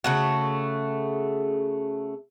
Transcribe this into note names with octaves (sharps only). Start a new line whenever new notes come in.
C#3 A3 F#4